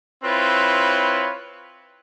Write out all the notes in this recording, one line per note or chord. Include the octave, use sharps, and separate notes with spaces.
C4 E4 F4 B4 C#5